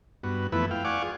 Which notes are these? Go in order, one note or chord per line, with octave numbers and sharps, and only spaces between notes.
G2 B3 F#4
F2 E3 A3 B3 E4 B4
F5 G5
D5 F5 F#5 G#5 C#6 D6
F4 G#4